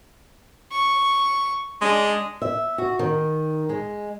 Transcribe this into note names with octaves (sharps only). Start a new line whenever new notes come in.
C#6
G#3 D4
E5
F#4
D#3
G#3